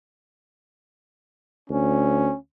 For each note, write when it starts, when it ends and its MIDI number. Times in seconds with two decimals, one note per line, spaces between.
1.70 2.30 38
1.70 2.37 61